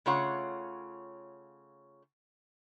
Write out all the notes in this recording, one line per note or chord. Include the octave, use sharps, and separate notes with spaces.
C#3 A3 F4 C#5 F#5